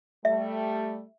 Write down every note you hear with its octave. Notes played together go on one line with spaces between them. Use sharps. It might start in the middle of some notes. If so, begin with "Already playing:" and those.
G3 A3 E5